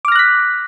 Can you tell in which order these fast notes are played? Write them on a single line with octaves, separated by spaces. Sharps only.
D6 F6 A#6 F#6 B6